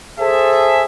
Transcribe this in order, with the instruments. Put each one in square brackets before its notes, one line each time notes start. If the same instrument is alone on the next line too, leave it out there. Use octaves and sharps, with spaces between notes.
[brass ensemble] G#4 A4 C5 E5